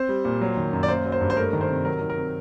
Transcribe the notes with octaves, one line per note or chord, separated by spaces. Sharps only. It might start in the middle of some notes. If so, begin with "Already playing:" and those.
Already playing: C4 C5
G3
A#2
F#3
D#3
F#2
D5
A#3 C5
F#3
C5
G2
C5
A3 A#4
D#3
C5
C3
F#3 A#4
D#3
A#4
C4